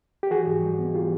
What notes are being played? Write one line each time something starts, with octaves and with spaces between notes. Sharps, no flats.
G4
E3 F#4 G#4
G#2
G3
B3
E3 F4 G4